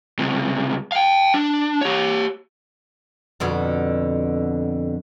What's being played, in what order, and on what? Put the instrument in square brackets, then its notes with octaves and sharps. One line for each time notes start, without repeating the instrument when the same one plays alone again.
[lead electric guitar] C#2 C3
F5 G5
D4
G4 C#5
[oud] F2 B2 D3